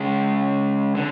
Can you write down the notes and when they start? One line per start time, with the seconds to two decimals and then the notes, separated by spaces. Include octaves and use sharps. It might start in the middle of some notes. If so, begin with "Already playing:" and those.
Already playing: C#3 G#3 C#4 G#4
0.95 D3